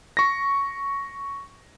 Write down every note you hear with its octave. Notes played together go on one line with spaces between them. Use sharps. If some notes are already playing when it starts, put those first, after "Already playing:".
C#6 A#6